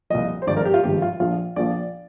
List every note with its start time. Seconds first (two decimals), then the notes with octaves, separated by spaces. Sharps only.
0.10 C2 A#2 F3 D#5
0.42 C5
0.47 G#1 G2 F3 D5
0.57 A#4
0.65 G4
0.74 F4
0.84 G#1 G2 F3 G4
1.02 F4
1.20 A#1 A#2 F3 F4
1.56 A#1 A#2 F3 D5